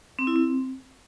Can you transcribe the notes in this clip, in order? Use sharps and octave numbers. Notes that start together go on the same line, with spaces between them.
C4
E4
C4